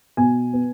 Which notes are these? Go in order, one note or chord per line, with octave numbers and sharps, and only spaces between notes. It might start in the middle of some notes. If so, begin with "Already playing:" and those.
B2 G#5
B3